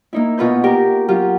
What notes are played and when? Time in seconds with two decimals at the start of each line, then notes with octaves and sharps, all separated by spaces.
0.13 A#3 D#4 E4
0.38 B2 F4 B4 G6
0.64 G4 A#4 G5
1.08 F#3 F4 G4